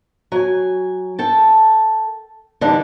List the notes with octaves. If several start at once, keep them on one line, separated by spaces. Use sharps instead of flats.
F#3 G#5
A4 G5 A5
D3 E3 G3 D4 D#4